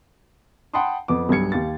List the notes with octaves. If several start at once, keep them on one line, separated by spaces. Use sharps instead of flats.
F#5 G5 A5 B5 C6 D#6
F2 B3 D6
B1 G2 G3 G#6 C#7
D#2 G4 F5 A6